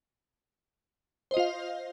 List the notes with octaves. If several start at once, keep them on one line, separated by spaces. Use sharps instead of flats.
F4 C5 D#5 F5